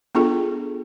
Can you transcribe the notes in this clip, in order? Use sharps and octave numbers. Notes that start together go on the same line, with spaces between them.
B3 D4 F4 G#4 A4